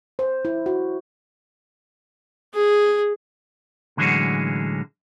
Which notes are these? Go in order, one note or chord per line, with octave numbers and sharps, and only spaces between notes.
C5
E4
F#4
G#4
A2 D3 E3 F#3 G#3 C#4